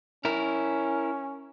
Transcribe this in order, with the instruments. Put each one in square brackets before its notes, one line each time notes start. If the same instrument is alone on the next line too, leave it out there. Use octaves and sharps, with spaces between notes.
[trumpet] C#4 [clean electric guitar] E4 A#4